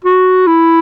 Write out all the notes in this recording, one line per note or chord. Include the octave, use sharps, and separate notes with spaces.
F#4
E4